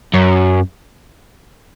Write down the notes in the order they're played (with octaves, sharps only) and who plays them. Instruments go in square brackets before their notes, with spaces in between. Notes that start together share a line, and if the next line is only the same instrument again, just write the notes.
[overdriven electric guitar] F#2